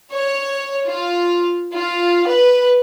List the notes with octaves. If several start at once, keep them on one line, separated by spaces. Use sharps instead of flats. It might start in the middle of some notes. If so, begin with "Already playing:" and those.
C#5
F4
F4
B4